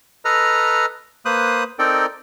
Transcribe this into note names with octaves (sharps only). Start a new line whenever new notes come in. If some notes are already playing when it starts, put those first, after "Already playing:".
A4 B4 D#5 A#5 F6
A#3 B4 C5 D#6 F#6
C4 D#4 A4 A#4 D5 G5